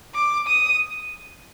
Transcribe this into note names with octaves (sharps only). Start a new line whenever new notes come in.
D6
D#6